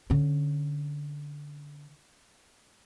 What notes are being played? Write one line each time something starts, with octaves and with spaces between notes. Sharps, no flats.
D3 C#4